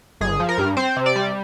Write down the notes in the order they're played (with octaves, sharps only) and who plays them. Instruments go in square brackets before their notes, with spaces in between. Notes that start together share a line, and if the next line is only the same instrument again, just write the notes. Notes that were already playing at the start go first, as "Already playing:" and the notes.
[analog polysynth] G1 G#4
F3
A#4
G2
C4 C5
C3
D5
G3